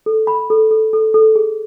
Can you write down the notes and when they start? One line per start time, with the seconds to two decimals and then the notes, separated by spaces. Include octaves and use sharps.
0.06 A4
0.27 B5
0.50 A4
0.71 A4
0.93 A4
1.14 A4
1.36 G#4